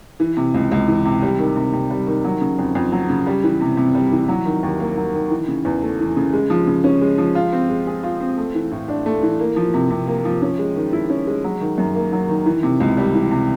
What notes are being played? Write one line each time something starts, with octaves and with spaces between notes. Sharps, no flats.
E3
C3
C#2
C#2
E3
C3
G3
D#3
C3
C3
G3
D#3
F#3
C#3
F2
F2
F#3
C#3
G3
E3
C3
C3
G3
E3
F#3
D#3
D#2
A#3
F#3
D#3
E3
C#3
E2
A3
E3
C#3
G#3
F3
C#3
C#4
G#3
F3
F4
C4
G#3
G#4
F4
C4
A3
E3
A2
D4
A3
E3
A#3
F3
C3
C3
A#3
F3
C#4
G#3
D#3
E4
C#4
G#3
F#3
D#3
F#2
A#3
F#3
D#3
E3
C3
C#2
G3
E3
C3